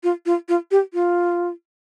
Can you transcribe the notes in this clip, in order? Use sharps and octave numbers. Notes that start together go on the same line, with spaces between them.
F4
F4
F4
G4
F4